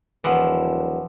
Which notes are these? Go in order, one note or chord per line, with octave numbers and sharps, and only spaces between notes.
D#1 E3 F3 B4 F#5